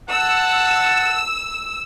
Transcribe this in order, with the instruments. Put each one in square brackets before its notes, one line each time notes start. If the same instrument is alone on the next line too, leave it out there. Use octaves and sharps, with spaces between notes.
[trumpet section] F#5 A5 [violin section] E6